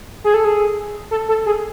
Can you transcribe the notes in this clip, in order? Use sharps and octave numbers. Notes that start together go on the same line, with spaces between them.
G#4
A4
G#4
A4
A4
G#4